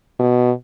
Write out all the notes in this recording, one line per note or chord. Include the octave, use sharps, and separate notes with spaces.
B2